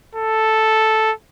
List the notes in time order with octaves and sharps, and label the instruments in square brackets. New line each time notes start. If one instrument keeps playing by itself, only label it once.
[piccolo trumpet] A4